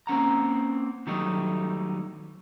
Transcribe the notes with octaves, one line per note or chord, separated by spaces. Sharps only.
A#3 C4 C#4 F#5 A#5
D#3 F#3 G3 A3 D#4